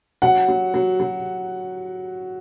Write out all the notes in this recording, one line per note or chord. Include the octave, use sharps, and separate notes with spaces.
F#3 F#5
F#3
F#3
F#3